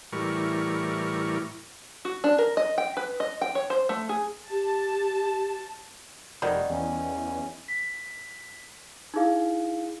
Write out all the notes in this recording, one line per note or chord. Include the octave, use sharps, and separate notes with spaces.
A2 E3 G3 A#4 C#6
F#4
D4
A#4
D#5
G5
B4
D#5
G5
C#5
C5
A3
G#4
G4 A5
F1 D#3 F#3 G3
E2 C#4
B6
D#4 E4 G#4 F5